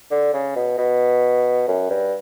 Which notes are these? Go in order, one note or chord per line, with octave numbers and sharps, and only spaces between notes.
D3
C#3
B2
B2
F#2
G2